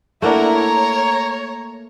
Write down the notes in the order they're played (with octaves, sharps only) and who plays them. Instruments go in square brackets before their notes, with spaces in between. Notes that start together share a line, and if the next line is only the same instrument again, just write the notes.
[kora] A3 A#3 D4 [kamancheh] E4 F#5 [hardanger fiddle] A#4 A#5
[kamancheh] C#5